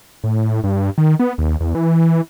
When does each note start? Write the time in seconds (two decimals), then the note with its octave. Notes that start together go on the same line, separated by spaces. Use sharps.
0.24 A2
0.64 G2
0.98 D#3
1.20 B3
1.38 D#2
1.60 E2
1.75 E3